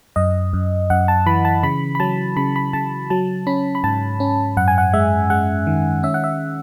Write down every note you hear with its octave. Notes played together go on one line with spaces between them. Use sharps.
F#2 D#5
F#2
F#2 F#5
A5
E3 B5
A5
C#3 B5
B5
F#3 A5
C#3 B5
B5
C#3 A5
F#3 A5
C#4 B5
B5
G#2 A5
C#4
F#2 F#5
G#5
F#5
G#3 E5
G#3 F#5
D#3
C#4 E5
F#5
E5